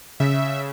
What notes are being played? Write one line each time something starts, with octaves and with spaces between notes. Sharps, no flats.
C#3 E5